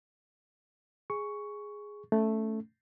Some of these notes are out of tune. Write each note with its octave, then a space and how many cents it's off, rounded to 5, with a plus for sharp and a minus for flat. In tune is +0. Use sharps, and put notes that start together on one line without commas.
G#4 +0 C#6 +5
A3 +0 C#4 +20